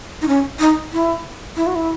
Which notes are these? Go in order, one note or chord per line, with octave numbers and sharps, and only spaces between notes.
D#4
C#4
D#4
E4
E4
F#4
E4